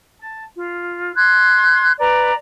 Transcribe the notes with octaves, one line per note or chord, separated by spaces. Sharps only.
A5
F4
C6 F#6 G#6
B4 D5 A#5